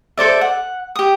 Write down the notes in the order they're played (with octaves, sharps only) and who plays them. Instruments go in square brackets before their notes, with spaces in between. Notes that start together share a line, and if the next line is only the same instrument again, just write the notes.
[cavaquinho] A4 C5 D5 E5
F#5
G4 D#6